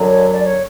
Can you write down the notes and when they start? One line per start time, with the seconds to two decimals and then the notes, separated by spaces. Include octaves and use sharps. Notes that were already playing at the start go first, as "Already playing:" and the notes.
Already playing: F#2 D3 F#3
0.08 C#5
0.33 D5
0.44 C#5